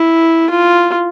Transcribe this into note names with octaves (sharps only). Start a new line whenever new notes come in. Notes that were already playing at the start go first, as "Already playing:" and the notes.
Already playing: E4
F4